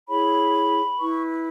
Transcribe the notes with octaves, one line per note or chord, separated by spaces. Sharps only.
E4 G#4 C#5 B5
E4 B4 C#6